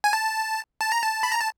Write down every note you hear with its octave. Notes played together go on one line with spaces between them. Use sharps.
G#5
A5
A5
A#5
A5
B5
A#5
A5